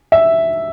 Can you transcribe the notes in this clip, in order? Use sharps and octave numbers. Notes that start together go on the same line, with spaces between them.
E5